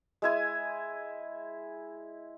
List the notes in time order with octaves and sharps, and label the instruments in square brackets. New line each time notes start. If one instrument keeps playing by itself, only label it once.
[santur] G#3 E4 G#5